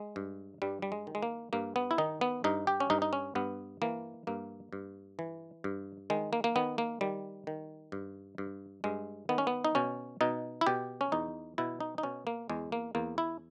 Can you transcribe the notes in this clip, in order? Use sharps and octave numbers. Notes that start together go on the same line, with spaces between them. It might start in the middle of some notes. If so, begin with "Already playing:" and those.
Already playing: G#3
G2
G2 G3
G3
G#3
D#3
G#3
A#3
G2 A#3
B3
E4
D#3 D#4
B3
G2 D#4
G4
C#4
G2 D#4
D#4
C#4
G2 B3
E3 A#3
G2 A#3
G2
E3
G2
D#3 G#3
A#3
A#3
D#3 B3
A#3
D#3 G3
D#3
G2
G2
G2 G#3
D#3 B3
C#4
B3
D#4
B2 C#4
B2 D#4
E4
B2 G4
C#4
E2 D#4
B2 E4
D#4
D#4
B2 C#4
A#3
E2 G#3
A#3
E2 A#3
E4